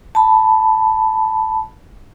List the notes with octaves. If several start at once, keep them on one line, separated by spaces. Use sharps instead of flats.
A5 B5